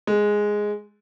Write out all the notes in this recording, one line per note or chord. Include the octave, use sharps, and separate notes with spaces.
G#3